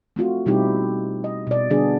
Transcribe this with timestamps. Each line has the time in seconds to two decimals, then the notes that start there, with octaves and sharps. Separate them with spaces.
0.16 A3 C4 F4 F#4
0.46 B2 G3 C4 D#4 E4 G4
1.24 D#5
1.47 B2 D5
1.70 D3 G3 B3 D4 G#4 D5